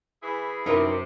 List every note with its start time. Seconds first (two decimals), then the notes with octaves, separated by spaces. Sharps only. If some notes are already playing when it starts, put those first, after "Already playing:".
0.23 E3 E4 G#4
0.66 F#2 C3 D#4 E4 A#4 B4